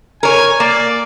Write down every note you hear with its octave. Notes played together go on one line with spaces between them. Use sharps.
A#4 C#5 G#5
A#3 D5